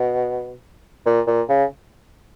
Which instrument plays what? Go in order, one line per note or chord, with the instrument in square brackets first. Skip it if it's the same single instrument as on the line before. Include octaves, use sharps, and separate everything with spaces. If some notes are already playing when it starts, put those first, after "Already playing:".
Already playing: [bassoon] B2
A#2
A#2
C#3